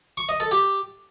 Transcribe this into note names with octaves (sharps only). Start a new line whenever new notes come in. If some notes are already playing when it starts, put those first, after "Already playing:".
C#6
D#5
A4
G4